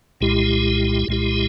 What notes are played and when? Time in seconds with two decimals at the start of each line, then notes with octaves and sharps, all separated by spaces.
0.21 C2 A#2 G#3 E4 G4
1.08 C2 A#2 G#3 E4 G4